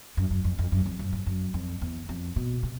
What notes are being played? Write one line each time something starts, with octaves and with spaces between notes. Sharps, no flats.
F#2
F#2
F2
F2
F#2
F2
F#2
G2
F#2
F2
E2
F2
B2
C3